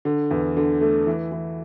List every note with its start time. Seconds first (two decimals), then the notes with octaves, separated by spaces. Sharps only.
0.05 D3
0.31 E2
0.57 D3
0.81 A3
1.07 E3
1.32 E3